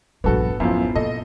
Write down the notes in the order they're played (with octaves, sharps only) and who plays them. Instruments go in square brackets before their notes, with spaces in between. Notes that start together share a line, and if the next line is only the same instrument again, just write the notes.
[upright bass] A#1 G2 [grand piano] B3 F#4 A4
[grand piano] F#2 A2 F3 [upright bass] B3
[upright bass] A#2 [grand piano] A4 D#5